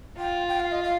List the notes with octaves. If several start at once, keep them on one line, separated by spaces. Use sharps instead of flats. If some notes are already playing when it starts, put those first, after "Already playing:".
F4 G5
G5
F5
D#5
F5